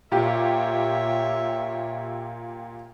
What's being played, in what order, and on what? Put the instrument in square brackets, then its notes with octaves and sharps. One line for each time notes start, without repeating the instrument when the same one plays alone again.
[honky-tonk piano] A#2 G4 [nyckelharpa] C#5 E5